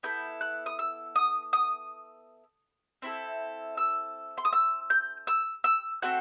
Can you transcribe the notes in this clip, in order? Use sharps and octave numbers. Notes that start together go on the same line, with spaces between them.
B3 E4 A4 G6
F#6
D#6
E6
D#6
D#6
C4 E4 A4
E6
C6
D#6
E6
G6
E6
E6
A3 C4 F#4 A4 F#6